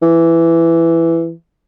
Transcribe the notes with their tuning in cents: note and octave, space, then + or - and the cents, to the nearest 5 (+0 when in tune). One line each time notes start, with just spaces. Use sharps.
E3 +10